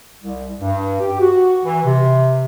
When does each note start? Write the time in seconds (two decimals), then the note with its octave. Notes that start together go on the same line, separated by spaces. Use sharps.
0.21 C2
0.60 G2
1.00 G4
1.20 F#4
1.64 E3
1.85 C3